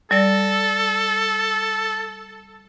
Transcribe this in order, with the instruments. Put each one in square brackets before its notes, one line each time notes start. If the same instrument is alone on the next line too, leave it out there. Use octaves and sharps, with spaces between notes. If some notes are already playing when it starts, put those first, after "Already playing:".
[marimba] G3 D5 A#6 [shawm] A4